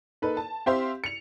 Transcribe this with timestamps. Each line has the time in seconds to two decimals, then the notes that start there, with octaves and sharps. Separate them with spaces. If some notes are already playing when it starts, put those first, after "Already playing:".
0.22 A#3 D#4 A4 B4
0.37 A5
0.66 C4 G4 C5 E5 F5 C6
1.04 C#7 F7